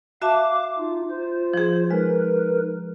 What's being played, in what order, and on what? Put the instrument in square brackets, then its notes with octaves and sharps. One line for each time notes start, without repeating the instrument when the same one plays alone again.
[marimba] F#4 E5 A5 [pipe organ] F5 D6
[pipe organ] D#4 F4
F4 C5
[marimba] F3 G#4
[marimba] G#3 [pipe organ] D#4 A#4 B4